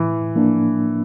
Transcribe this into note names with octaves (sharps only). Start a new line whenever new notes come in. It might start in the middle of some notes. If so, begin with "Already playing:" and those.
Already playing: A2 E3
F3 A#3 D4